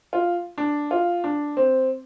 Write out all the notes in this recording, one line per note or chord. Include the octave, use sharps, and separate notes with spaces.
F4
D4
F4
D4
C4